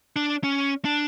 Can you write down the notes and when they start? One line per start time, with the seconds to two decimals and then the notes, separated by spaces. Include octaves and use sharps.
0.16 D4
0.44 C#4
0.85 D4